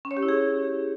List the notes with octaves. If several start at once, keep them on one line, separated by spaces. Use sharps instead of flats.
C#4
C#5
G4
E4
G#4